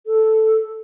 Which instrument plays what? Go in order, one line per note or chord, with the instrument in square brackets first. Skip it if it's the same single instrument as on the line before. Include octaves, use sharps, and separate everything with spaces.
[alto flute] A4